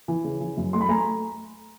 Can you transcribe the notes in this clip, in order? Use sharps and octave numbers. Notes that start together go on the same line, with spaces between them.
E3
C#3
E3
F#2
A3 C6
B5
A3 G#5 A#5